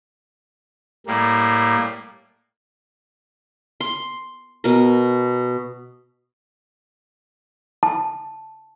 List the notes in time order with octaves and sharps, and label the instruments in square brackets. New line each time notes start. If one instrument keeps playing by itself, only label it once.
[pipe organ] A2 G3 A#3
[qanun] C6
B2 A#4
[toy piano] A5